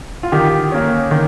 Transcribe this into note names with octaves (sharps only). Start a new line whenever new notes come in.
F4
D#3 G4
A#3 C#4
D#3